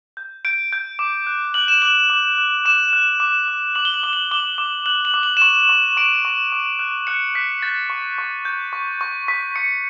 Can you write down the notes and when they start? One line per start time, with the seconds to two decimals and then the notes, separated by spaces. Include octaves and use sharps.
0.17 G6
0.45 G6 D7
0.73 G6
0.99 D6
1.27 F#6
1.54 F#6 F#7
1.68 E7
1.82 D6 F#7
2.10 D6
2.38 F#6
2.65 D6 E7
2.93 F#6
3.20 D6
3.48 D6
3.75 D6 F#7
3.85 G7
3.94 F#7
4.03 D6 G7
4.13 F#7
4.31 D6 G7
4.58 D6
4.86 F#6 F#7
5.05 F#7
5.14 D6
5.23 F#7
5.37 E7
5.42 C#6 F#7
5.69 C#6
5.97 C#6 D7
6.25 C#6
6.52 D6
6.79 F#6
7.07 F#6 C#7
7.35 F#6 B6
7.62 G6 A6
7.90 C#6
8.18 C#6
8.45 G6
8.73 C#6
9.01 C#6
9.28 C#6 B6
9.56 C#6 C#7